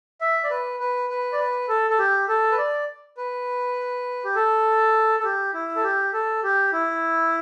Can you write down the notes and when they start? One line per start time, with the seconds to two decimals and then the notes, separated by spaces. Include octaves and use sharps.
0.21 E5
0.44 D5
0.50 B4
0.80 B4
1.10 B4
1.32 D5
1.39 B4
1.69 A4
1.90 A4
1.98 G4
2.29 A4
2.52 B4
2.58 D5
3.17 B4
4.25 G4
4.35 A4
5.20 A4
5.24 G4
5.54 E4
5.76 A4
5.84 G4
6.13 A4
6.43 G4
6.73 E4